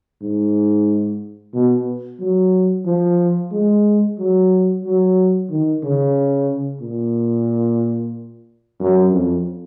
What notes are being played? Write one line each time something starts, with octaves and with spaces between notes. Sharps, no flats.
G#2
B2
F#3
F3
G#3
F#3
F#3
D#3
C#3
A#2
F#2
F2